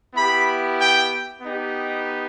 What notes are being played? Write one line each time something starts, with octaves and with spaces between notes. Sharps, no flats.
B3 E4 G4 B5
G5
B3 D#4 G4